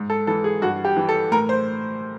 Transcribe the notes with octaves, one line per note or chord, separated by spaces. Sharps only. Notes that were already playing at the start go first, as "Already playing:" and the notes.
Already playing: G#2
A4
E3 A4
G#4
G2 F#4
G4
E3
A4
A2 A#4
C5